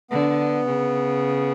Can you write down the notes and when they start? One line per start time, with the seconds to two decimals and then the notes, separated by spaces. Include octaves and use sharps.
0.10 D3 B3
0.66 C#3